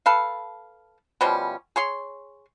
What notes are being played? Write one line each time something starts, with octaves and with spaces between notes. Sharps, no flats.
A4 B4 F5
B2 F3 G3 C#4
G#4 C#5 C6